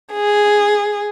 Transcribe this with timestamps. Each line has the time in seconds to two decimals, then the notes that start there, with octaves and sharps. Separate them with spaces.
0.14 G#4